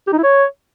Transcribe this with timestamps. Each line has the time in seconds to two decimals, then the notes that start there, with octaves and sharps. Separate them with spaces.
0.08 G4
0.13 D#4
0.18 E4
0.23 C#5